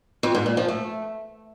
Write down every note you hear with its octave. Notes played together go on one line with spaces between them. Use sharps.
F2
G#2
A#2
F3
A3